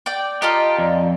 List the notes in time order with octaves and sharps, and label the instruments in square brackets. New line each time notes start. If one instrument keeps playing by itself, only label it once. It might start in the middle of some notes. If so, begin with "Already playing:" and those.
[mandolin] D5 G5
[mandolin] F4 A4 D#5 [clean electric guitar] G4 [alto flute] A#5
[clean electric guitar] F2 [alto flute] D5